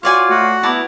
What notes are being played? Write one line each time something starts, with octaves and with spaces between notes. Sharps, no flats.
F4 F#4 C#5 D5 G#5
A3 F#4
B3 E4 D5 A5 A#5